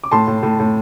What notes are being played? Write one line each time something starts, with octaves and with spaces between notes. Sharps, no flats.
D6
A2 A5 C6
A2
A2
A2